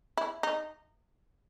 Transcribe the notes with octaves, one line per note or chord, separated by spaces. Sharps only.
E4
D#4